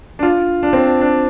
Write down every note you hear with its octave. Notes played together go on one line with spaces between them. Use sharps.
D4
F4
D4
C4
D4
D4